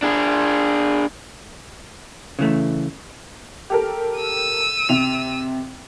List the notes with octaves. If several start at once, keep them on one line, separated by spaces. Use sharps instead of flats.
D4 G#4
C#3 E3 A3
G4 A4 A#4
E6 D#7
C3 F7